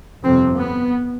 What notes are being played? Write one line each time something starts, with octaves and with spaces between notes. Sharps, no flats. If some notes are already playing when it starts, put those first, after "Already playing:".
G1 F2 C3 C4
B3